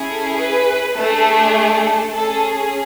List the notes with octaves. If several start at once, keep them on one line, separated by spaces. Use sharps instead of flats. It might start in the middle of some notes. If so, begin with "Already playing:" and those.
Already playing: C#4 E4 G#4
A4
B4
A3 D4 G#4 A4
A4
C#4 G#4 A4